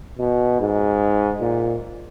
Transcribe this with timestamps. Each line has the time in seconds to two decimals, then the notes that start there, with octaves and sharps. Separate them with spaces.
0.19 B2
0.61 G#2
1.41 A#2